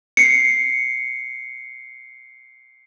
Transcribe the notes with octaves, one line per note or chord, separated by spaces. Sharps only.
C7 C#7